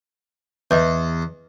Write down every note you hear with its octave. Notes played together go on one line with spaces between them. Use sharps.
E2 B4 D#5